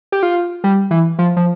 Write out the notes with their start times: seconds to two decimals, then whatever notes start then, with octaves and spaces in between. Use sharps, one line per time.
0.12 G4
0.23 F4
0.64 G3
0.91 E3
1.19 F3
1.37 F3